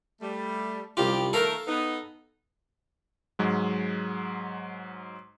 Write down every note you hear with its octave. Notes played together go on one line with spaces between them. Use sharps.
G3 A3
C2 F#2 F3 F4 G4
D#3 A3 A4 A#4 F5
B3 D#4
G#2 F#3 G#3